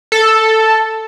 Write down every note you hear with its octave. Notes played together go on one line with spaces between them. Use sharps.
A4